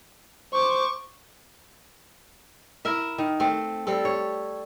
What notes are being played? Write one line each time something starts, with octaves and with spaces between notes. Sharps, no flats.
C5 C#6 D6
E4 A#4 E5
D#3
A3 C4
G3 C4 A4
C#5